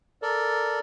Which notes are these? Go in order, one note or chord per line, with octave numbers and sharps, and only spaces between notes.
A4 A#4 D5